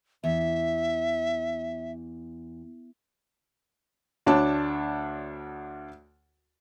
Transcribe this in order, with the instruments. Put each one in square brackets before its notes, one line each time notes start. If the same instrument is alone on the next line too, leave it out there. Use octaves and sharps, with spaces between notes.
[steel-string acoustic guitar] E2 [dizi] E5
[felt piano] D2 D4 C#5 A5